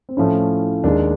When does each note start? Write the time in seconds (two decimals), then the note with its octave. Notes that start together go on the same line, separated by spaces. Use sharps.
0.09 C4
0.17 A2 F3 A3 C#4
0.84 D#2 D#3 G#3 D4